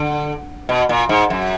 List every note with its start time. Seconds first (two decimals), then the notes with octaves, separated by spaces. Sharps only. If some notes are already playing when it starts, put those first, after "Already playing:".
Already playing: D3
0.69 B2
0.89 A#2
1.09 G#2
1.30 F#2